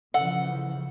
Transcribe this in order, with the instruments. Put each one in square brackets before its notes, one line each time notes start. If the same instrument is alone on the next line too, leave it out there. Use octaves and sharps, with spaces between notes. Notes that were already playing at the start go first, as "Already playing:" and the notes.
[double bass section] C#3 E3 F3 [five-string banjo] A4 F#5